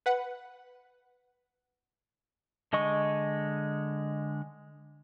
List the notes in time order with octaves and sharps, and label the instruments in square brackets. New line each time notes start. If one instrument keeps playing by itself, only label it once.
[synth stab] B4 F#5
[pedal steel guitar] D3 G#3 D#5 C#6